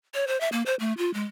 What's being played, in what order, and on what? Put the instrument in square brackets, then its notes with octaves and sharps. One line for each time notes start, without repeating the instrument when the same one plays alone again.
[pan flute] C#5
C5
E5
A#3
C5
A3
F4
G#3